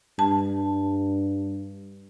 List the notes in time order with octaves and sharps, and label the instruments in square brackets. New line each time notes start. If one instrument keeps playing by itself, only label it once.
[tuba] G2 [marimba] A5